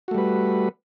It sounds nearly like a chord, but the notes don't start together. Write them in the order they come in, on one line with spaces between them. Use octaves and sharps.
F#4 A3 G3 B4